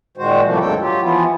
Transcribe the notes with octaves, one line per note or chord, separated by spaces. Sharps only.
A#2 D#3 G#3 F#4 C5
A2 C3 F3 G3 A3 A#3
D2 G2 F#3 G#3 A4 G5
F#3 F4 G4
E3 F3 B3 E4 F4